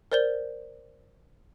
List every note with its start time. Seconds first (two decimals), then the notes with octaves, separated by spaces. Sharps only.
0.12 A#4 C5 D5 G6 G7